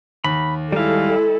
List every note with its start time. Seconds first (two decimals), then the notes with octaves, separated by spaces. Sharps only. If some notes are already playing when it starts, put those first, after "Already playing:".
0.24 D#2 B5
0.73 G3 G#3 E4 A4 F5